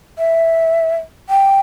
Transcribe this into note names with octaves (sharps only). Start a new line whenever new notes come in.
E5
G5